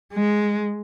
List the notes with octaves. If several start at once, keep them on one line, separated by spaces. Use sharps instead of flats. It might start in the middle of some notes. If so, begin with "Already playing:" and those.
G#3